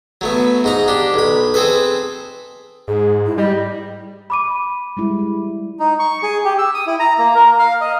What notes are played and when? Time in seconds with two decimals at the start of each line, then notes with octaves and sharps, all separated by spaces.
0.21 F#3 A3 B3
0.64 G#2 D#4 A#5
0.88 D4 G4
1.14 B1 B5
1.54 C4 G#4 A4 B4
2.88 G#2 G#4
3.26 E4
3.38 G3 D#5
4.30 B5 D6 D#7
4.97 G3 G#3 E4
5.79 D#4
5.99 C#6
6.23 G#4
6.45 G4
6.58 E6
6.74 D#6
6.87 E4
7.00 A#5
7.19 A#3
7.35 A#4
7.59 F5
7.81 D#5